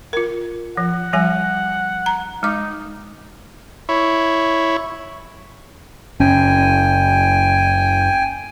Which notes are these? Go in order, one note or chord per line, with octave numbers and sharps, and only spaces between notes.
F4 A#4
F3 F#5
F3 G3 G#5
A#5
G#3 D#4 D6
E4 C#5
F#1 C#4 G5 G#5